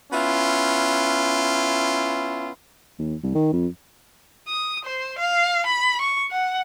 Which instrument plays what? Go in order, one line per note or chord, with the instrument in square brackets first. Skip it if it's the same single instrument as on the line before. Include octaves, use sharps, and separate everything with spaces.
[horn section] B3 C#4 E4 F4
[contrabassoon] D#2
C2
D#3
F2
[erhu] D#6
C5
F5
B5
C#6
F#5